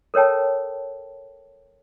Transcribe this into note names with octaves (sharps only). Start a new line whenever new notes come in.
A4 A#4 C#5 G5 A5